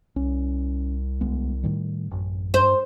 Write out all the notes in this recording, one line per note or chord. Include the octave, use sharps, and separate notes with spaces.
C2 C#4
D2 G#3 B3
A2 D#3 G3
A1 F#2
G2 C5